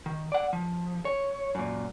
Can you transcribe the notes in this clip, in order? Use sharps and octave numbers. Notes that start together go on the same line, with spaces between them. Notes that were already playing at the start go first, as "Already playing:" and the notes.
D#3
D5 F#5
F3
C#5
F#2 A#2